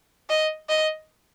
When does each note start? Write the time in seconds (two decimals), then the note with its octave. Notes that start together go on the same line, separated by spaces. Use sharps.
0.29 D#5
0.69 D#5